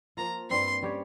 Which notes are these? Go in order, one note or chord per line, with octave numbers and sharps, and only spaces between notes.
F3 A#3 F4 A#5
G2 G3 C4 G4 C6
G3 C#4 G4 C#5